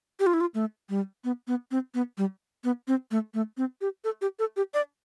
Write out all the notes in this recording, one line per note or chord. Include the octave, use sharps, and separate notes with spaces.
G4
F4
E4
F4
A3
G3
B3
B3
C4
B3
G3
B3
C4
A3
A3
C4
G4
A4
G4
A4
G4
D5